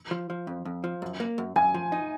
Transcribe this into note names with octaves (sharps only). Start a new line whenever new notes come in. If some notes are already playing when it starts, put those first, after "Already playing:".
F3
F3
F2
F2
F3
F#2
A#3
F#2
F#2 G#5
F3
D#4